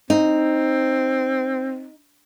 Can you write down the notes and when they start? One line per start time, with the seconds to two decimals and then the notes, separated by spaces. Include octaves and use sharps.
0.10 C4 D#4